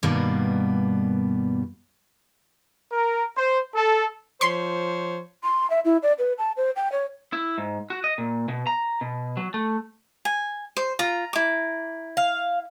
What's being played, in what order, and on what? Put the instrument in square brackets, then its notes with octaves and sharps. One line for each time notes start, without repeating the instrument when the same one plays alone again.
[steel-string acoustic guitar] G2 B2 D#3 G3 A#3 B3
[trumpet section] A#4
C5
A4
[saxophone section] F3 C5 C#5 [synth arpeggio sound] C6 B6 C7
[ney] C6
E5
E4
D5
B4
A5
C5
G5
C#5
[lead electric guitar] E4
G#2
F#4
D#5
A#2
B2
A#5
B2
F#3
A3
[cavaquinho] G#5
C5
[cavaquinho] F4 [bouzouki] A#5
[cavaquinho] E4 D6
[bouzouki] F5